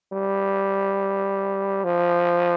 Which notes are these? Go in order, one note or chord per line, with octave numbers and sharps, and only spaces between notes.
G3
F3